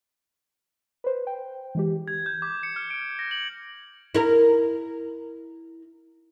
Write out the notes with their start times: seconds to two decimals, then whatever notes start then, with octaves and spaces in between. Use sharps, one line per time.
1.04 B4 C5
1.27 G5
1.75 E3 G#3 G4
2.08 G#6
2.26 G6
2.42 D6
2.63 C#7
2.76 F6
2.90 D7
3.19 A#6
3.31 F#7
4.15 E4 A#4